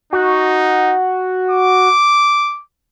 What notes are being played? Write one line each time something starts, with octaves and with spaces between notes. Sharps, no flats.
D#4 F#4
D6